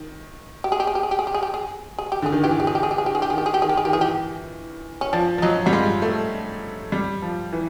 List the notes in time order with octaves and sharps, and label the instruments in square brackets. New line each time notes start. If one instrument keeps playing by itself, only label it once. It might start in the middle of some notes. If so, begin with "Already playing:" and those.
Already playing: [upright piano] D#3
[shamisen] G4
G#4
G4
G#4
G4
G#4
G4
G#4
G4
G#4
G4
G#4
G#4
G4
[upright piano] D3 [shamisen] G#4
[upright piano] D#3
[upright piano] E3 [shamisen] G4
[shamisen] G#4
G4
G#4
G4
G#4
G4
G#4
G4
G#4
G4
G#4
[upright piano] D#3 [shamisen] G4
[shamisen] G#4
G4
[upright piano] D#3 [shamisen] G#4
[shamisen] G4
G#4
[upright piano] D#3 [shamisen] G4
[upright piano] E3 [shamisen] G#4
[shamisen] G4
C#4
[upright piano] F3 [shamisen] D4
[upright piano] F3
[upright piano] F#3 [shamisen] D#4
[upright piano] G3 [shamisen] F#4
[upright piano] G#3 [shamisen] F4
[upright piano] A3
G3
F3
E3